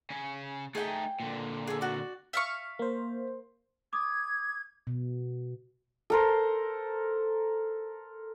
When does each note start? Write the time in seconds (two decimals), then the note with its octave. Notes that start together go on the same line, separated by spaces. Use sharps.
0.10 C#3 C#4
0.75 A3 D#4 G#4 G5
1.20 A#2 D3
1.67 G#4 A4
1.81 F#4 D5
2.33 E5 F5 C#6
2.79 A#3 C5
3.93 D6 D#6 G#6
4.87 B2
6.10 A4 A#4 C5